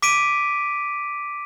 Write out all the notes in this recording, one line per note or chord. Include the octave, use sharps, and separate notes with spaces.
D6 B6 D7 D#7